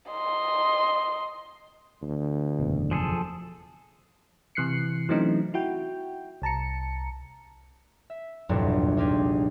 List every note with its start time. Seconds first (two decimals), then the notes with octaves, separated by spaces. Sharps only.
0.12 D#5 C6
2.02 D2
2.59 F#1 E2 B2
2.91 F3 G#4 A4
4.55 C3 E3 F#6 C7 C#7
5.09 E3 F#3 A3 C4 C#4 D#4
5.54 E4 F#4 G5
6.42 C2 A5 A#5 C#7
8.10 E5
8.49 F1 B1 E2 G2 A#2 C4
8.97 D4 D#4 F4 G4 G#4